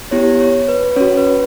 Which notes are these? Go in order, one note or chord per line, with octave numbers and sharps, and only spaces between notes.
B3 E4 G4 C#5
C#5
B4
C#4 F#4 C#5
B4